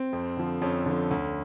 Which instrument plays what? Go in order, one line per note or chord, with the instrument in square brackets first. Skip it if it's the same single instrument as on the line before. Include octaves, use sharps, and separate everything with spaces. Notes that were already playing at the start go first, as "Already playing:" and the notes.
Already playing: [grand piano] C4
F2
D3 F3
F2 C#4
D3 F3
D2